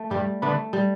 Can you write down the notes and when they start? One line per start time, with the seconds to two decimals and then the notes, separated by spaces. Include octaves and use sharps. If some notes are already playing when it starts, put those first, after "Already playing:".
Already playing: A3
0.10 G2 G3
0.42 D3 A3 B3
0.73 G3